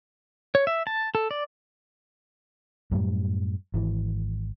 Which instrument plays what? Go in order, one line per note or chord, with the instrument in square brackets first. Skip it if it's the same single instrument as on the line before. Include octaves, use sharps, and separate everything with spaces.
[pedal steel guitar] C#5
E5
A5
A4
D5
[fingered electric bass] F#2 A2 G3
G#1 E3